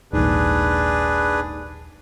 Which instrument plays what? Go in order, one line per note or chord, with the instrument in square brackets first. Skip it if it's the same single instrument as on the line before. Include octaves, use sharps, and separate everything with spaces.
[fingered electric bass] D#1 A#1 [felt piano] D#2 G#2 [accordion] D4 G#4 B4